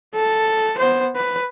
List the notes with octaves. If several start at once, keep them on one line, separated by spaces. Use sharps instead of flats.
A4
B3 C5
B4